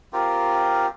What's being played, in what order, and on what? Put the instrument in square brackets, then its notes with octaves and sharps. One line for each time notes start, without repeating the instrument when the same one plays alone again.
[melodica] C4 F4 G4 A#4